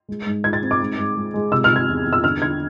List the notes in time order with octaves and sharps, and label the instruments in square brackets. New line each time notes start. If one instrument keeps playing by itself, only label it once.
[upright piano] G#3
G#2
G#2 G#6
A6
C4
D6
G#2
G#2
G#3
G#3
C3 E6
F6
C3
G#6
E2
E2
E6
D3 F6
D3 G#6